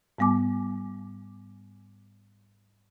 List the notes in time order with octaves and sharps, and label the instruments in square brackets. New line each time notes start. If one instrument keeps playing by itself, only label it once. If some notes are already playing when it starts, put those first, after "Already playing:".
[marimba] G#2 G3 B3 G#5 D6